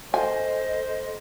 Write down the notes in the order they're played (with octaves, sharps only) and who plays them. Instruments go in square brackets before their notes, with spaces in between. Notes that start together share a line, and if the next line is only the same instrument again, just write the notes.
[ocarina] A4 [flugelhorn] C5 [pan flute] D#5 [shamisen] G#5